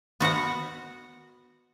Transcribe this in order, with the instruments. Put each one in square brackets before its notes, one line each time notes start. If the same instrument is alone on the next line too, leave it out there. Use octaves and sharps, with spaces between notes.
[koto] B3 F#4 A#4 F#5